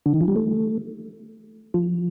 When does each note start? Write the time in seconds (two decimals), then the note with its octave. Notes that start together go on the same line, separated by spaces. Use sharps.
0.06 D3
0.14 D#3
0.21 F3
0.28 G3
0.36 A3
1.74 F3